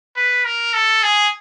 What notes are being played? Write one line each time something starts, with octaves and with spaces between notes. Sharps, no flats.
B4
A#4
A4
G#4